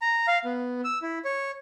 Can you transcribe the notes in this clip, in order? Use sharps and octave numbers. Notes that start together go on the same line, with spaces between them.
A#5
F5
B3
E6
E4
C#5